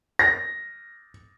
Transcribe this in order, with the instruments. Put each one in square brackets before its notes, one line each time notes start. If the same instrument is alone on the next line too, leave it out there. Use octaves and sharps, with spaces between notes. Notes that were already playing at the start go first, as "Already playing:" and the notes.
[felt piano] A#6